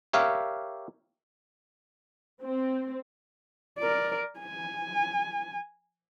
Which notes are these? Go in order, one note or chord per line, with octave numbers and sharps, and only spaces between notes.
G4 A#4 C#5 E5 F5
C4
A#4 D5
G#5